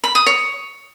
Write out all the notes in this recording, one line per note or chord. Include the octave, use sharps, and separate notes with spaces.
B5
D#6
C#5